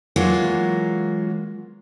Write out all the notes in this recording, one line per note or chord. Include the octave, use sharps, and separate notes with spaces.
E3 F#3 G#3 A#3 F4 F#4